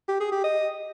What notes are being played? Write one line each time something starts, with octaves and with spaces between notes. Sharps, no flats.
G4
G#4
G4
D#5